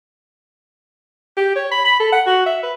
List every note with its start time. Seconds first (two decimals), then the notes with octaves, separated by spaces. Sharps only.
1.37 G4
1.55 C#5
1.71 B5
1.85 B5
2.00 A4
2.12 F#5
2.26 F#4
2.46 E5
2.63 B4